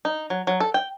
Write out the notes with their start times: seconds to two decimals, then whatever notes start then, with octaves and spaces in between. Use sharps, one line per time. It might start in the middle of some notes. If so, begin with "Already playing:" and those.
0.05 D#4
0.30 F#3
0.47 F#3
0.60 A4
0.74 G5